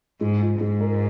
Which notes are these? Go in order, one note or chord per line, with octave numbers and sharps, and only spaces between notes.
G#2 G#3
F4
G#2 G#3
A#4